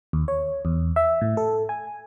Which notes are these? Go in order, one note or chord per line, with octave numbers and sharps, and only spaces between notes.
D#2
C#5
E2
E5
A2
A4
G#5